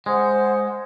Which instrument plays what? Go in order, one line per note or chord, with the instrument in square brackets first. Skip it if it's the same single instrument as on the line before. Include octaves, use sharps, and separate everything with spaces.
[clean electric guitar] G#3 [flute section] C5 F#5